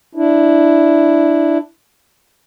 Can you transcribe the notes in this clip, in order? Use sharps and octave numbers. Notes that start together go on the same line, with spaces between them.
D4 E4